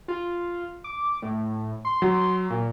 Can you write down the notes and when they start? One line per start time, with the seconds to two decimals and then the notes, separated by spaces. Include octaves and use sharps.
0.08 F4
0.84 D6
1.22 A2
1.85 C6
2.02 F#3
2.50 A#2